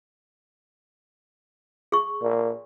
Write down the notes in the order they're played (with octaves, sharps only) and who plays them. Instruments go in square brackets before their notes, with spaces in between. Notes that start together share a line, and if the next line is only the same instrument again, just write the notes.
[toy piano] G#4 C#6
[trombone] A#2